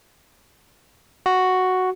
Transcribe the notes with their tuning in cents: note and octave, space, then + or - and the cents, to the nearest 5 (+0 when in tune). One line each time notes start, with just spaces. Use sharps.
F#4 +0